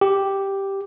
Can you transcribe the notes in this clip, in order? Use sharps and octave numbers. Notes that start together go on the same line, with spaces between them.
G4